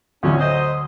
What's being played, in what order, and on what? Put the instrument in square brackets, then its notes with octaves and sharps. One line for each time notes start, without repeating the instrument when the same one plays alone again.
[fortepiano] D2 F#3 [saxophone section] C#4
[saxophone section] C5 D#5